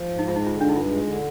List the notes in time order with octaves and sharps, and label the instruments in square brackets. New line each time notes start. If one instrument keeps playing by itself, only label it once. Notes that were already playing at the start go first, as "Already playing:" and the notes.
Already playing: [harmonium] F3
G#2
[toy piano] D#4
[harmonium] G#3 [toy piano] F4
[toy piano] D#4
[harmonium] D3 [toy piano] F4
[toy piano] D4
[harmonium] G2 [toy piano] D#4
[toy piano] F4
[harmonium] G#3
D3